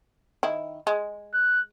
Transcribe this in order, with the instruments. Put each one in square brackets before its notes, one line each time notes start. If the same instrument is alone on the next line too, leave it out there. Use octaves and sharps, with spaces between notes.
[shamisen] D#3 E4
G#3
[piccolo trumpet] F#6